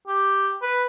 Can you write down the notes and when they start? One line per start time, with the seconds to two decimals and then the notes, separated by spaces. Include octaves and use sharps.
0.07 G4
0.62 B4